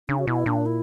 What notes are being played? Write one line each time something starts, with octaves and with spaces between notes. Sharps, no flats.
C#3 D4
F#4
B2 E4
A#2 D4
E4